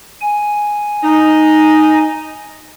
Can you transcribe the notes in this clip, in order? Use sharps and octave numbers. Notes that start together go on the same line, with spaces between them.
G#5
D#4